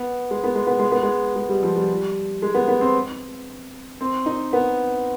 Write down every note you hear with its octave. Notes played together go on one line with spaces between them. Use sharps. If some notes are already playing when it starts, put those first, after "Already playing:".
Already playing: B3
G#3
B3
G#3
B3
G#3
B3
G#3
G#3
G3
F3
G3
G#3
B3
B3
C4
C4
D#4
B3